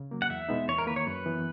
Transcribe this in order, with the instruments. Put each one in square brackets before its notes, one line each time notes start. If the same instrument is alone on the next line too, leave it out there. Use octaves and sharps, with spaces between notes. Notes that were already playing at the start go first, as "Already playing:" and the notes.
Already playing: [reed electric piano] C#3
F#3 A#3
[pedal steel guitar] F#5
[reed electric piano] E2 [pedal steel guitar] E5
[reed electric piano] B2 G#3 B3 D#4
[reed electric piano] E2 [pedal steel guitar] C#5
[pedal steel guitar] A#4
[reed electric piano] D#3 A#3 [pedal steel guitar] B4
[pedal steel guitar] C#5
[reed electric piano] F#2 [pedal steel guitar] B4
[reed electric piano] E3 B3